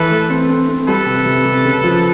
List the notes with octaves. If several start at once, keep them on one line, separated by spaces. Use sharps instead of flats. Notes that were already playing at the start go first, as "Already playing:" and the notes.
Already playing: E3 A4 B4
A3
C4
C4
C4
G3 A4 B4
C3
C3
C3
C#3
F3